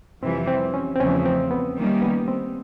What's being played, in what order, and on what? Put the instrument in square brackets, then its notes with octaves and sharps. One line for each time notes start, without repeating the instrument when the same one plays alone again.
[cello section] F2 C3 E3 G3 [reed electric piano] C4
[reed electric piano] C4
C#4
C4
[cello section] E2 C#3 F3 A3 [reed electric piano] C#4
[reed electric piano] C4
B3
[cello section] D#3 G3 A#3 C#4
[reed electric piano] B3
C4